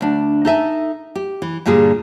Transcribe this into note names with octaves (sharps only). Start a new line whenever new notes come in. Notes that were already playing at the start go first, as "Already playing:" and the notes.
D2 D4
D#4 A4 E5 G#5
G4
E3
G2 A#2 D3 G3 G#4